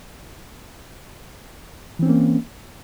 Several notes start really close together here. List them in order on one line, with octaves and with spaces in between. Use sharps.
E3 C4 C#4 A#3